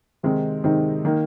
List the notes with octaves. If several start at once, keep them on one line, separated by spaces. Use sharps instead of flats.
C3 D#3 G#3 C4 D#4
C3 D#3 G#3 C4 D#4
D#3 A#3 D#4